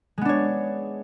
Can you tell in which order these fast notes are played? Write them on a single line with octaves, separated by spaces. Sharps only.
G#3 B3 D4 C#5